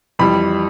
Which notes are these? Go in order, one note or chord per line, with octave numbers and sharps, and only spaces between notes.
F2 E3 G3 B5